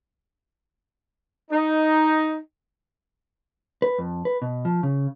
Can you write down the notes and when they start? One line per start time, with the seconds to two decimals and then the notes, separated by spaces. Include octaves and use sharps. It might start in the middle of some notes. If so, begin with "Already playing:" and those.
1.51 D#4
3.82 B4
3.98 F2
4.25 B4
4.42 B2
4.65 F3
4.83 C#3